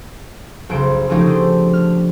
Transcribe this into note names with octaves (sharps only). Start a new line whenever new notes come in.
F#1 B1 C#3 C5 D7
F3 A3 C4 C#4 D#4 G4
D3 C5
F6